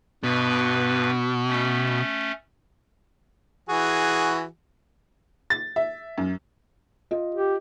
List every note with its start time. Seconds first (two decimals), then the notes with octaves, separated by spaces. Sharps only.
0.23 G2 B2 B4
1.49 A3 C#4
3.69 E3 F#4 G#4
5.50 A6
5.76 E5
6.18 F#2
7.11 F4 D#5
7.35 G4